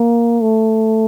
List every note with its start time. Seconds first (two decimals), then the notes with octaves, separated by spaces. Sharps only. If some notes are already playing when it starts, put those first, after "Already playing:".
Already playing: A#3
0.42 A3